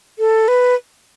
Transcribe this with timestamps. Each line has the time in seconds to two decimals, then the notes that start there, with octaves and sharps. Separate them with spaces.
0.19 A4
0.48 B4